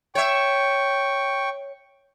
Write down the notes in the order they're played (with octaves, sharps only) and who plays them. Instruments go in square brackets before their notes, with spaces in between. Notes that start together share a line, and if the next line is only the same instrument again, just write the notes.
[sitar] C#5 E5 [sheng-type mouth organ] G5 C#6